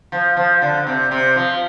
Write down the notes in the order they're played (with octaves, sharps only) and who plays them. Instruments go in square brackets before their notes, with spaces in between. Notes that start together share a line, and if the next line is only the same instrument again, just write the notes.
[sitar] F3
F3
D3
C3
C3
F3